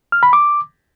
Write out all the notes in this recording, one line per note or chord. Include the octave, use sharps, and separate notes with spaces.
F6
B5
D6